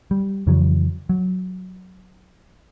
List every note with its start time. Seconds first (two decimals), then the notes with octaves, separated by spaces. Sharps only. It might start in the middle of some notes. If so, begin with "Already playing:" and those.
0.11 G3
0.47 F2 C#3 E3 F#3
1.09 F#3